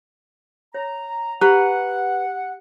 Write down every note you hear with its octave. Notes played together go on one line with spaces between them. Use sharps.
C#5 A#5
G4 B4 F#5 A#5